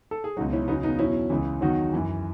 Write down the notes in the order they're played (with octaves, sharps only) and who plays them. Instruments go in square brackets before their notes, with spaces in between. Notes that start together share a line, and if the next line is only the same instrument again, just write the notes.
[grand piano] A4
G#4
C#2 B2 F#3 D#4 F#4
C#4 E4
E2 C#3 F#3 B3 D#4
B3 D#4
E2 B2 F#3 C#4 E4
C#2 C#3 E3
E2 D#3 F#3 D#4 F#4
F#2 E3